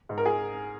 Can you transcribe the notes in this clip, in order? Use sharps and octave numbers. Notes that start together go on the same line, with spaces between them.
G#2
A#4
G#4